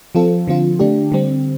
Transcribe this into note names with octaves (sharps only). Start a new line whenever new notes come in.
F3 C4 F4 A4
D3 F3 C4 F4
D3 A3 D4 G4
D3 G3 C4